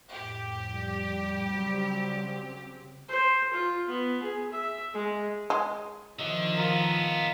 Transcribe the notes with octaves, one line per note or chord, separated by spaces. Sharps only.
F2 A2 G4
G3
C#3 F#3 C4
C5
F4
B3
G#4
E5
G#3
G#3
D3 D#3 F3 D#5 E5 F#5
B3 F4 A4 A#4 D#6